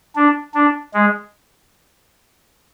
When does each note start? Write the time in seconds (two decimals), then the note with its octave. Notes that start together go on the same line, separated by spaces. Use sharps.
0.16 D4
0.54 D4
0.94 G#3